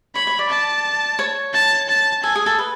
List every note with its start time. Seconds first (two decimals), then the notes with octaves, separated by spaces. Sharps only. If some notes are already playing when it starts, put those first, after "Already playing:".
0.15 C#5 B5
0.27 C#5
0.39 D5
0.49 A5
1.19 C#5
1.53 A5
1.89 A5
2.23 A4 G#5
2.35 G#4
2.46 A4
2.59 B4